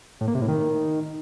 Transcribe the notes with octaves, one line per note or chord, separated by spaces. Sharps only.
A2
A#3
C3
A2
D#3